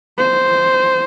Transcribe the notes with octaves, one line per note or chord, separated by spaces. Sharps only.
C5